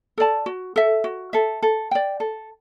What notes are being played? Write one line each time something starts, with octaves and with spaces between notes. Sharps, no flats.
A4 D5 A5
F#4
A4 E5
F#4
A4 E5
A4
D5 G5
A4